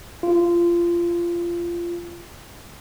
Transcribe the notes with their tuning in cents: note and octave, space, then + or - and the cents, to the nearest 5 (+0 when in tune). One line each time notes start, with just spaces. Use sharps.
F4 -20